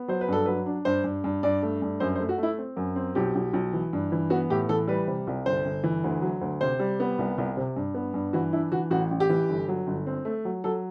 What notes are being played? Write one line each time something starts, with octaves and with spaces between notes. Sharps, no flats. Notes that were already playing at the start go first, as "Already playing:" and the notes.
Already playing: B3
F#3 C5
B4
G2 A4
F#3 B4
D4
G2 C5
G2
G2
G2 D5
A3
G2
F#2 C5
C5
A3
F#4
A3 E4
C4
F#2
C4
B1 G4
B1
B1
E3
G2
E3
B3 F#4
A2 G4
E3 A4
G3 B4
C3
C2
G1 C5
G1
E3
D2
F#3
D2
C3 C5
G3
B3
C2
C2
C3
G2
B3
G2
E3 F#4
D4 E4
E3 F#4
A1 F#4
A1
G4
E3
G1
F#3
G1
C4
A3
F#3
F#3 A4